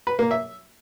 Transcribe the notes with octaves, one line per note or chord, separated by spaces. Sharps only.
B4
A#3
E5